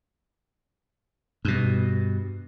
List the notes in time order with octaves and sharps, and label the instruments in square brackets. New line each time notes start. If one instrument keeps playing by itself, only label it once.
[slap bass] G2 B2